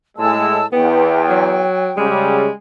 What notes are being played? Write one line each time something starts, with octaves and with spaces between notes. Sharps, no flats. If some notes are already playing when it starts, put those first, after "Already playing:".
A2 G#3 A5 E6
E2 B3 G5
F#3
C#3 G3 G#3